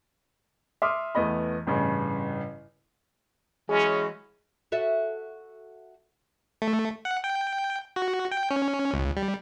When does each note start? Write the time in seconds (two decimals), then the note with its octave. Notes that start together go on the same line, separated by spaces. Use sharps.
0.82 E5 C6 D6 D#6 F6
1.15 E2 A3 B3 D#5 B5
1.67 A1 G2 C#3
3.69 E3 F#3 G#3 C#4 G#4
4.72 F#4 A4 E5
6.62 A3
7.05 F#5
7.24 G5
7.96 F#4
8.31 G5
8.51 C#4
8.94 C#2
9.17 G3